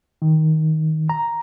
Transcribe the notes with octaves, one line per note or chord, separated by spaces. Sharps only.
D#3
A#5